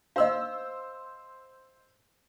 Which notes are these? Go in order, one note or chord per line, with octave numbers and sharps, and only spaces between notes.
C5 D#5 F5 E6